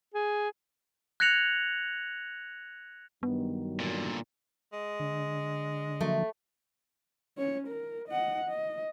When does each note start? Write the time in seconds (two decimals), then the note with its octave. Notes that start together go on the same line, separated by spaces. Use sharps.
0.14 G#4
1.20 F#6 G#6 A#6 C#7 F7 F#7
3.23 G2 D#3 F#3 B3
3.80 A#2 D3
4.73 G#3
5.00 D3
6.01 F3 F#3 A3 A#3
7.38 C#4 C#5
7.67 A#4
8.08 D#5 F#5
8.48 D#5